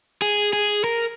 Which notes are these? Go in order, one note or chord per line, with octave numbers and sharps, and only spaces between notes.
G#4
G#4
A#4